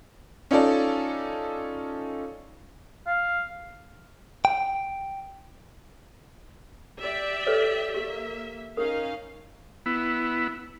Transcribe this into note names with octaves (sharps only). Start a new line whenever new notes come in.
C#4 D#4 F4 A4 D5
F5
G5
G4 D5 E5
A4 B4 C#5
A#3 G4 E5
C#4 D#4 A#4 F5
B3 E4